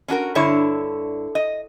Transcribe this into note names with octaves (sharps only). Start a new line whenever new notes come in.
C#4 D4 F#4 A#4
G2 D3 E4 C#5
D#5